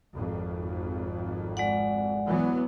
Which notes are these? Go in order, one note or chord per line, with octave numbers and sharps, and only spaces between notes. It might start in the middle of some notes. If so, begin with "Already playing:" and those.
G#1 F2
G#3 D5 F#5
E3 F#3 B3